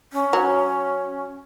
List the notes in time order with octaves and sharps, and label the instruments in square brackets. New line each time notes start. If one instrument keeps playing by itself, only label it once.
[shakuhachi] C#4
[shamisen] F#3